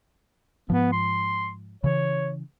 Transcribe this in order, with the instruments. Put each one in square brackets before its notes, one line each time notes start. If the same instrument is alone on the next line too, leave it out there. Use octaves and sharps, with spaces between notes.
[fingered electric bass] G#2 F3 [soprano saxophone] B3
[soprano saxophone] C6
[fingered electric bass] C#3 E3 [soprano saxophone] C#5